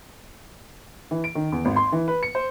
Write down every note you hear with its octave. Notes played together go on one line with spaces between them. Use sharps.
E3
D7
D#3
E2
G#1
C6
E3
B4
C#7
C5